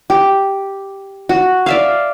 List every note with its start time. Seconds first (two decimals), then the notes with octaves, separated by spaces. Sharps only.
0.10 G4
1.29 F#4
1.66 D5 E5 F5